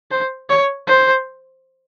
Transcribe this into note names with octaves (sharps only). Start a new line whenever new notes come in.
C5
C#5
C5